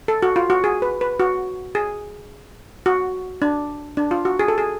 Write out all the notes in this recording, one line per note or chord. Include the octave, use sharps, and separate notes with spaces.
A4
F#4
F4
F#4
G#4
B4
B4
F#4
G#4
F#4
D4
D4
F4
F#4
G#4
A4
G#4